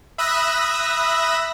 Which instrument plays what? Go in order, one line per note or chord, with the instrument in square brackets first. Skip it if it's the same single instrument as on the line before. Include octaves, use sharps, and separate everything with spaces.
[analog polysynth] E5 B5 D#6 E6 F#6 A#6